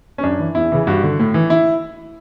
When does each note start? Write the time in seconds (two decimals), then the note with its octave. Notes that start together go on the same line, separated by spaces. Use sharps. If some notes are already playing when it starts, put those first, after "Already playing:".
0.18 C#4
0.23 F#2 D4
0.39 E3
0.55 E2 E4
0.72 C#3 E3
0.87 G2 F#4
1.03 D3
1.19 A2
1.34 E3
1.50 E4